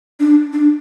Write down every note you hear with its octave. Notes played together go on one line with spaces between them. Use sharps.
D4
D4